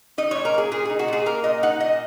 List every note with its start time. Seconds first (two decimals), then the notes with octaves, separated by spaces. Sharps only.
0.18 D#4 D#5
0.31 A#2 C#5
0.45 A#4
0.54 A#3 G#4
0.71 A#2 G#4
0.85 D#4 G#4
0.99 F#4
1.08 A#2 G#4
1.26 A#3 A#4
1.44 A#2 D#5
1.63 D#4 F#5
1.80 A#2 D#5